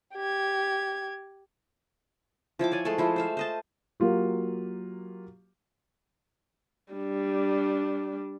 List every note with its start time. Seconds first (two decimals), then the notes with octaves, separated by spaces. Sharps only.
0.14 G4 G#6
2.59 F3 E4 G5 D6
2.72 C#5 D5 G#5
2.85 G#3 A3 A4 C6
2.98 F3 E4
3.16 C5 E5 F5
3.37 C5 D#5 A5
4.00 F#3 A#3 F4 G4
6.93 G3 D4